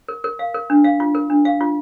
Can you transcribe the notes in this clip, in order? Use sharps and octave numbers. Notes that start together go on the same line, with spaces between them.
A#4
A#4
F5
A#4
D4
F5
F4
A#4
D4
F5
F4